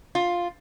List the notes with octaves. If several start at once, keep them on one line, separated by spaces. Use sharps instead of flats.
F4